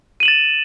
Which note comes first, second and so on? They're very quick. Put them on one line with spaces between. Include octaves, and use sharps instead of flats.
D#7 F#7 E7 A6